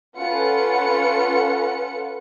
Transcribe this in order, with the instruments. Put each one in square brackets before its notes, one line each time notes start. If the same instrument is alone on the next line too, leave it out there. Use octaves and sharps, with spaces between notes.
[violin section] C#4 F4 A4 B4 F#5 C#7